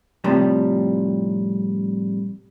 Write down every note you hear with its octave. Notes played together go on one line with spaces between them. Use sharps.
A2 C3 F3 G3